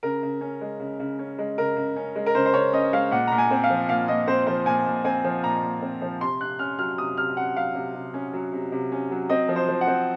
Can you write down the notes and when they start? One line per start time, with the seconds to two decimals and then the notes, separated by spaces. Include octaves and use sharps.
0.03 C#3 A#4
0.23 C#3
0.41 C#4
0.61 G#3
0.80 C#3
1.00 C#3
1.19 C#4
1.39 G#3
1.58 C#3 A#4
1.76 C#3
1.96 C#4
2.16 G#3
2.26 A#4
2.35 C#3 C5
2.46 C5
2.54 C#3 C#5
2.73 C#4 D#5
2.93 G#3 F5
3.11 A#2 F#5
3.27 A#2 A#5
3.38 G#5
3.51 C4
3.64 F5
3.70 F3
3.89 A#2 F5
4.08 A#2 D#5
4.28 C4 C5
4.47 F3 C5
4.66 A#2 G#5
4.86 A#2
5.04 C4 G#5
5.24 F3
5.44 A#2 A#5
5.62 A#2
5.82 C4
6.02 F3
6.21 C3 C6
6.40 C3 F#6
6.59 C#4 F6
6.79 F#3 F6
6.98 C3 D#6
7.17 C3 F6
7.36 C#4 F#5
7.56 F#3 F5
7.75 C3
7.94 C3
8.14 C#4
8.33 F#3
8.53 C3
8.72 C3
8.92 C#4
9.11 F#3
9.30 C4 D#5
9.49 F3
9.56 C5
9.68 F3
9.81 F#5
9.87 C4